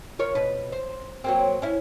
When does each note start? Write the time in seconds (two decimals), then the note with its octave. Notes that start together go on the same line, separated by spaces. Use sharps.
0.19 F4 A#4 C#5
0.35 B2 B4
0.72 C5
1.24 F#3 A#3 C4
1.62 C#4 E4